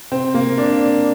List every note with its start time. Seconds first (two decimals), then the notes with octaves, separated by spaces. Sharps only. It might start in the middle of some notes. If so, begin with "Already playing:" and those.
0.12 C4
0.34 A#3
0.58 D4